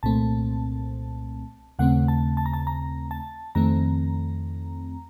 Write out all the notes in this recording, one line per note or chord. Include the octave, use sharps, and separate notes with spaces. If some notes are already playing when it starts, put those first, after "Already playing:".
C2 A#2 A3 C4 A5
D#2 C#3 A3 C4 F#5
A5
A5
A#5
A5
A#5
A5
F2 D#3 A3 C4 A#5